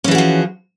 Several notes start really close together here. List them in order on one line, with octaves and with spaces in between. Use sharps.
C#4 E3 G#4 F#4 F3